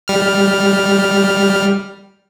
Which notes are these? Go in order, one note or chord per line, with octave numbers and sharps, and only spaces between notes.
G3 F6